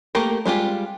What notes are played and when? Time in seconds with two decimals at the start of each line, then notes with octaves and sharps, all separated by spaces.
0.15 A3 A#3 G4 A#4
0.46 G3 G#3 F4 G4